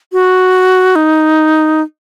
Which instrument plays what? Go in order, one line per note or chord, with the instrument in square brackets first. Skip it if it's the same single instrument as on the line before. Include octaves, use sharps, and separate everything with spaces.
[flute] F#4
D#4